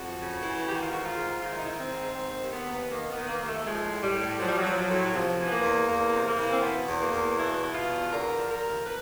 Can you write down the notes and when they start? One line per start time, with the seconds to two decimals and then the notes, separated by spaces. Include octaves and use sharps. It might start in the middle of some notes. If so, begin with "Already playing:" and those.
Already playing: F2 F#4
0.18 C#3
0.43 E3
0.67 D#3 G4
0.75 F#4
0.83 F4
0.90 G#2 F#4
1.05 F4
1.17 G#2
1.41 D#3 F4
1.49 E4
1.57 D#4
1.65 D#3 E4
1.79 C4
1.91 G#2
2.15 D#3 C4
2.41 D#2
2.53 B3
2.66 D#2
2.90 D#3 A#3
3.09 B3
3.16 D#3
3.27 A#3
3.40 D#2 A#3
3.47 A3
3.58 A3
3.65 F3 G#3
3.89 A2
4.02 G3
4.14 A2
4.40 F3 F#3
4.48 G3
4.58 F#3
4.64 F3
4.76 F#3
4.89 A2
5.04 F#3
5.13 C3 F3
5.38 E3
5.46 B3
5.51 A#3
5.63 E2
5.88 E2 A#3
6.13 C3
6.26 A#3
6.38 E3
6.53 C4
6.62 B2 B3
6.87 E2
6.99 A#3
7.12 E2
7.37 B2 E4
7.62 B2
7.74 F4
7.86 E2
8.11 D3 A#4
8.36 F3
8.48 A#4
8.61 D#2
8.86 B4